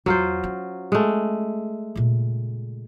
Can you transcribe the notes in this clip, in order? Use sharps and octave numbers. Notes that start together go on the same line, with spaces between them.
E2 F#3 F4 C5
C#4
G#3 A3
A#2 C#3